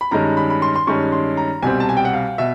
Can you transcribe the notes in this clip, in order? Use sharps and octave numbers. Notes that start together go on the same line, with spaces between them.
B5
G2 D#3 G#3 C#4 A#5
B5
B5
C6
C6
G2 D#3 G#3 C#4 C#6
C6
A#5
C2 B2 G3 C4 G#5
A5
G#5
G5
F#5
F5
B2 E5